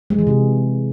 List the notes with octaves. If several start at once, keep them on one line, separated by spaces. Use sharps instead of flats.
G#3
E3
C3